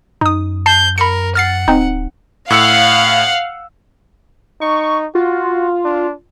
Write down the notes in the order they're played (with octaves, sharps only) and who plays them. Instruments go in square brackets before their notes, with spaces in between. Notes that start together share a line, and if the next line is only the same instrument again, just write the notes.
[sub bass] F#2 [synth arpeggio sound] D#4 D#6
[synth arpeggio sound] A5 C7 [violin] G6
[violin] A#4 [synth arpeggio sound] B5 C#7
[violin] F#5 [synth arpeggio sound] F6 A6 C7
[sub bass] D1 [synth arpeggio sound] C4 D#4
[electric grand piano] A2 E6 C#7 [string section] F5 [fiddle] F#5
[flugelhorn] D#4 [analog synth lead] C#6
[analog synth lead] F4 [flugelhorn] F#4
[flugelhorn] D4